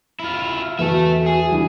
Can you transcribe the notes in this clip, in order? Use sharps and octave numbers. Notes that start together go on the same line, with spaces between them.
E4 F4
E2 F#4 A4 B4 E5
G#4
D3 E3 G3